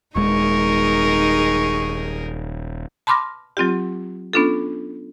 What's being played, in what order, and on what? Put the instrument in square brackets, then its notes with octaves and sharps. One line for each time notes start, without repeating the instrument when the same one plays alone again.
[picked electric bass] D#1 G#3 [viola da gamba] D#4 G#4 A#4 [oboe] C#6
[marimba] A5 B5 C6 D6 F6 A#6
F#3 C4 F4 G4
B3 C#4 D4 F4 A4